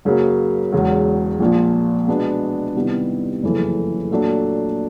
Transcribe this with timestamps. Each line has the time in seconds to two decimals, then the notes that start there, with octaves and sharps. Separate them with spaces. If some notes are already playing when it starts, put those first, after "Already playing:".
0.05 F#2 C#3 F#3 A#3
0.72 E1 E2 C#3 F#3
1.40 A#1 A#2 F3
2.08 B2 G#3 B3 D4
2.75 C3 D#3 G3 B3 E4
3.43 F#1 F2 C#3 E3 A3
4.11 A#2 F#3 A3 D4